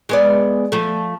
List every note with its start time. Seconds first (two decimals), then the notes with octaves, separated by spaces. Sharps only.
0.09 G#3 B3 D5
0.72 F3 A3